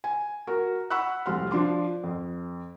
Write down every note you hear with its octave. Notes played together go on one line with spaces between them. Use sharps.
G#5
F#4 A#4
F#5 B5 C#6 E6 F#6
F1 C2 C6 F6
F3 D4 C6 D6
F2